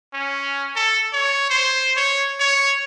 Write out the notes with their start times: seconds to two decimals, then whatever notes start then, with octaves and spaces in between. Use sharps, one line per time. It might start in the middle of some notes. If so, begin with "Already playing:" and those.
0.14 C#4
0.76 A4
1.13 C#5
1.50 C5
1.97 C#5
2.40 C#5